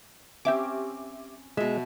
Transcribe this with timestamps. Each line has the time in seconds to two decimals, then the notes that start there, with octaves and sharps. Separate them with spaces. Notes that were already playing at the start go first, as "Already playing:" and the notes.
0.45 C4 C#4 G4 E5 D6
1.57 B2 G#3 E5